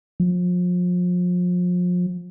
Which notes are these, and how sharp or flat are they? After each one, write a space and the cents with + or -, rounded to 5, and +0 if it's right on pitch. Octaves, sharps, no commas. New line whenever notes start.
F3 +35